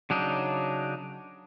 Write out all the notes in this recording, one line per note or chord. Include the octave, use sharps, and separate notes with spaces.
C#3 F#3 D4 D#4